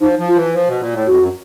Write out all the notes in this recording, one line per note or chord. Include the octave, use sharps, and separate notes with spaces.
F3 D#4
F3
F4
E3
F3
B2
A#2
A2
F2 F#4
F#2